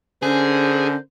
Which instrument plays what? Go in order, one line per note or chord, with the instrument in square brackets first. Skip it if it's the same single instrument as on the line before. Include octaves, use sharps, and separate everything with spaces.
[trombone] D3 [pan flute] C#4 [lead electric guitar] G#4 [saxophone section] A#4 C5